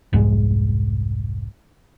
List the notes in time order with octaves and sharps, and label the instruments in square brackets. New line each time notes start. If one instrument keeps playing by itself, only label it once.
[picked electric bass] F1 C2 G#2 G#3